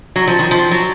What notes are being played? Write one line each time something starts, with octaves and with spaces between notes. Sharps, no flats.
F#3
F3
D#3
F3
F#3